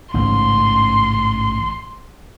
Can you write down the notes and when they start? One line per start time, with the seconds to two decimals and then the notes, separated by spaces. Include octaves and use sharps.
0.14 A1 G#2 C#3 C6